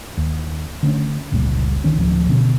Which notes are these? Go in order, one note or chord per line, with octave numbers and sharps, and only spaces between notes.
D#2
D3 A3 C#4
F#1 C#2 A#2 G3
A#1 D3 D#3 C#4
D1 F3
B2 D3 C#4